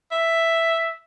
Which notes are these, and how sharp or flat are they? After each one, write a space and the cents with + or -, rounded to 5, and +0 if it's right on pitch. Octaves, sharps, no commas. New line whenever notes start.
E5 +0